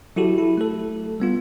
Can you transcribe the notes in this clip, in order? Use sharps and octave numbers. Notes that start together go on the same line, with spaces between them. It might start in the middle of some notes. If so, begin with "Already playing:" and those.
F#3 E4 F#4 G4 A4
E4
A3 A4
G3 B3 F4